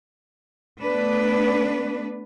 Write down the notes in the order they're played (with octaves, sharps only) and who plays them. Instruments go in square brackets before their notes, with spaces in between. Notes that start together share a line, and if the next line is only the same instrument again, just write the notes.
[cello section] A3 B3 D4 B4